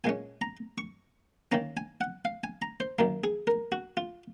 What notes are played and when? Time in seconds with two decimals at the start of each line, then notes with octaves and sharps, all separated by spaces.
0.04 A#2 G#3 C#4 G#5
0.41 A#5
0.78 C#6
1.52 D#3 A#3 C#4 A#5
1.77 G#5
2.01 F#5
2.25 F5
2.44 G#5
2.62 A#5
2.80 C5
2.99 F#2 D#3 A#3 A#4
3.24 G#4
3.47 A#4
3.72 F#4
3.97 F4